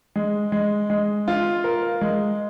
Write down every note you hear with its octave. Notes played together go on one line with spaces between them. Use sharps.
G#3
G#3
G#3
F4
A#4
G#3